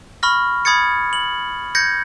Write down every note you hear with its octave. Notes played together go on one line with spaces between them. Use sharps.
B5 C#6 F6 A#6
B5 D#6 G#6 A6 C#7
F#7
G6 G#6 A#6 C#7